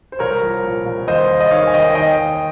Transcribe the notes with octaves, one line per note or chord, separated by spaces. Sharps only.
C5
C2 A#4 C#5
F3
A#2
C2
D#2 C5 D#5
D#2
D#5
D#3 C#5 F5
G#5
D#3 D#5 G5
D#2 D#5 G5
D#2